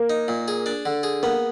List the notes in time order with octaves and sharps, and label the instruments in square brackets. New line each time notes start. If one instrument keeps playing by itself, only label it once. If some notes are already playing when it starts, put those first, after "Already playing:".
Already playing: [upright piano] A#3
[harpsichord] D#4
A#2
G#4
D4
D3
G#4
[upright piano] A#3 [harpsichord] B3